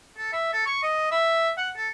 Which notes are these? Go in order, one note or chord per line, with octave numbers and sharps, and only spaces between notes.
A4
E5
A4
C#6
D#5
E5
F#5
A4